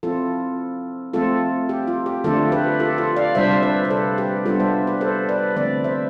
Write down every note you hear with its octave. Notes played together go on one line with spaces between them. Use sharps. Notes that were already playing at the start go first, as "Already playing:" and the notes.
F3 C4 E4 F4 A4
F3 A3 C4 F4 A4
G4
F4
G4
D3 F3 A3 D4 F4 A4
G4 B4
F4 A4
F4 A4
D5 F5
C3 G3 D4 F4 C5 E5
B4 D5
B4
A4 C5
G4 B4
G3 B3 D4 F4 A4
C5 E5
G4 B4
A4 C5
B4 D5
D3 F3 A3 C4 B4 D5
C5 E5